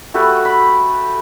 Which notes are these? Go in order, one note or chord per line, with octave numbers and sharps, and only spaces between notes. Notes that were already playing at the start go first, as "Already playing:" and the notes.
A3 F#4 G4 B4
B5